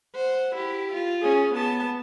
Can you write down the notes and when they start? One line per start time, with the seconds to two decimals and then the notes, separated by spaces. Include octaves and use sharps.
0.15 C5 F#5
0.56 E4 G4
0.93 F4
1.22 C#4 G#4
1.55 B3 A5